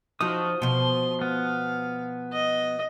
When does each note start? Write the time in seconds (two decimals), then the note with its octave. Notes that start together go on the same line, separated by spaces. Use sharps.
0.21 F3 F#3 D#4 F4 F#4 D#6
0.62 B2 F3 C6
1.21 B3 F5
2.32 D#5